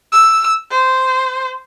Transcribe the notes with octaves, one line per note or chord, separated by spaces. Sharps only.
E6
C5